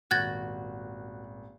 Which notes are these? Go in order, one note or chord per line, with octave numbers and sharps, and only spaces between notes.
D#1 G#1 F#4 F#6 G#6 A6